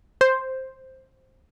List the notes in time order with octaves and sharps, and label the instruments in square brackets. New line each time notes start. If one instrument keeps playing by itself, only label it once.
[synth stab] C5